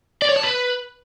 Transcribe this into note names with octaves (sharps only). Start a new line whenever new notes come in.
D5
C#5
A5
B4